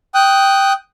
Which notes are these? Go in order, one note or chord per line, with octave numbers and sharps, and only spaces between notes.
G5 D#6 F#6